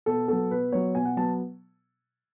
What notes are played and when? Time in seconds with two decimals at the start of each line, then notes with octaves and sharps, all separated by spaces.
0.06 B2 A4
0.28 F#3 B3 A4
0.50 B2 B4
0.72 F#3 B3 C#5
0.95 B2 G#5
1.05 F#5
1.17 F#3 B3 A5